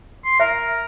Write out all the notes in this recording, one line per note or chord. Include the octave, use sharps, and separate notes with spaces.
C6
A#4 E5